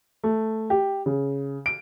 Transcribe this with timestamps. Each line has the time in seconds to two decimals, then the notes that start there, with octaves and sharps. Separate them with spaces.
0.24 A3
0.70 G4
1.06 C#3
1.66 D7